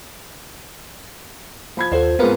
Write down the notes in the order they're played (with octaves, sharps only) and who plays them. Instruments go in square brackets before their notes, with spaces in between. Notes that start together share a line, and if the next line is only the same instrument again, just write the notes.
[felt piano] F3 B5 G#6
[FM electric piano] D#2 F4 A4 [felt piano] C5
[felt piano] G#2 B3 F4 [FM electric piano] C4 A#4 B4